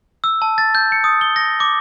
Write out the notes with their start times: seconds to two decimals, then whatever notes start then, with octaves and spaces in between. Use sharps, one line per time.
0.24 E6
0.42 A5
0.58 A6
0.75 G6
0.92 C#7
1.04 D#6
1.21 G7
1.36 A#6
1.60 D6